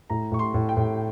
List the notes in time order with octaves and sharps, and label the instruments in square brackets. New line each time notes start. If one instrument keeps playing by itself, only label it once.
[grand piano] A2 A#5
A2 C#6
C6
A2
G5
A2